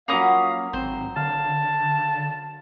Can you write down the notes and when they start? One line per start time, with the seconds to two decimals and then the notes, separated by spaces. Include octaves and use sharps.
0.08 F#3 A#3 C#4 F5 B5 D#6
0.73 G#1 C4 C5
1.16 D3 F5 A5